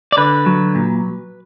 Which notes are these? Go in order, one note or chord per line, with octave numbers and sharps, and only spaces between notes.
D5
D3 B4
F#3
A#2